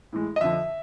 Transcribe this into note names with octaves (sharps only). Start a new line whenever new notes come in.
A2 E3 G#3
D#5
F2 D3 F3 E5